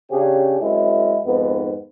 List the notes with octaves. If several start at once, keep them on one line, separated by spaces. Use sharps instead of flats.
C#3 C#4 D4 G4 G#4
F#2 G#3 C4 E4
F2 G#2 D#3 B3